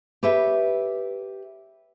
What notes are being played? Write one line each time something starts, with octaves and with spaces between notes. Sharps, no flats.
G4 A4 B4 C#5 E5